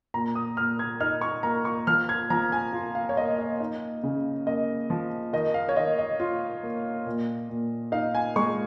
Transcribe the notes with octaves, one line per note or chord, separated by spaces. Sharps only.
A#2 A#5
D#6
A#2 F6
G#6
D#4 F6
C#6
A#3 A#5
C#6
F3 F6
G#6
F3 A#5
G#5
F4
F5
C#5
A#3 D#5
D#5
D#4
C#3
A#3 D#5
F3
D#3 D#5
F5
C#5
D#3 D#5
D#5
F4
A#3
A#2
A#2
D#4 F5
G#5
G#3 C#6